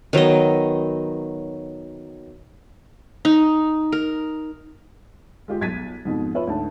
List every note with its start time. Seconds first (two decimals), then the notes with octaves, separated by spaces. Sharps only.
0.13 D#3 F#3 B3 D#5
3.25 D#4
3.92 A#4
5.48 G#3 F4 G4
5.61 B1 G#6 A6 B6 D#7
6.05 F2 G#2 B2
6.35 F4 B4 C#5 E5
6.47 D2 G#2 A5